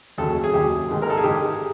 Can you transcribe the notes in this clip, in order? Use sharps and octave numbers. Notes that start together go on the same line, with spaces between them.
D#2 C#3 F#3 A4
G#4
D#2 C#3 F#3 G4
G#2 D#3 G#3
A#4
A4
G#4
G#2 D#3 G#3 G4